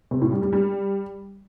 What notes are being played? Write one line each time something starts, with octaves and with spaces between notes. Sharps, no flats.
C3
A2
G3
G3
G3